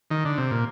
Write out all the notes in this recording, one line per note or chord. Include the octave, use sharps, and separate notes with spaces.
D#3
D3
C3
A#2